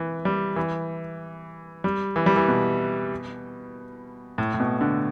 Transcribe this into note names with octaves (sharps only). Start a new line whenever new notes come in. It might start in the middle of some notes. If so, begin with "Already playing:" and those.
Already playing: E3
G3
E3
G3
E3
G3
E3
B2
A2
A2
B2
D3